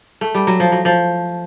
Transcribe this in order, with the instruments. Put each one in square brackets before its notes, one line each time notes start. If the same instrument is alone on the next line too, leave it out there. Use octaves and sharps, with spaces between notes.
[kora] A3
G3
F#3
F3
F#3
F3